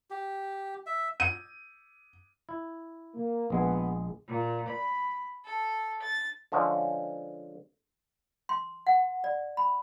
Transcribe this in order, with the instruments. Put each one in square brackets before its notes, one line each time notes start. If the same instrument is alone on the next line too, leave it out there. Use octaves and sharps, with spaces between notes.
[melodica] G4
E5
[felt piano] D#7
[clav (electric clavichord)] E4
[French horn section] A#3
[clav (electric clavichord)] A#1 G#3 G#4 [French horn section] B3
[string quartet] A#2
B5
A4
A6
[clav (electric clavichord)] D3 F3 G#3 C#4
[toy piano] C6
F#5
D5
B5